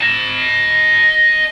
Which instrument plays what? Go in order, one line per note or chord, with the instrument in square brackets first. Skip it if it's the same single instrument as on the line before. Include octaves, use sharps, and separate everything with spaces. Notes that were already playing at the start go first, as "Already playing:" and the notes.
[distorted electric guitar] D#5 A5